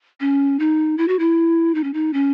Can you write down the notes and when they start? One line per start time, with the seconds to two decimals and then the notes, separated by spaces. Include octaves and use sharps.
0.20 C#4
0.59 D#4
0.98 E4
1.08 F#4
1.19 E4
1.75 D#4
1.84 C#4
1.94 D#4
2.13 C#4